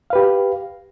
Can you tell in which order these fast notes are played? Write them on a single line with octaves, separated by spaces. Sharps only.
F5 B4 G4